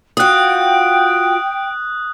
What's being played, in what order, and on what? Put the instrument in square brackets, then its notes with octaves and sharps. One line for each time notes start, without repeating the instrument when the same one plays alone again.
[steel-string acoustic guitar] F4 F#4 [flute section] G5 [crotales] D#6 F#6